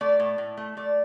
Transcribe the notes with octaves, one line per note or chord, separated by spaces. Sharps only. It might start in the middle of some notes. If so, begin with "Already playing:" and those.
A3 D5
A2
A2
A3
A3 D5